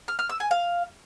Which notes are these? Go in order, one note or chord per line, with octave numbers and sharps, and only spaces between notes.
F6
F6
E6
G#5
F5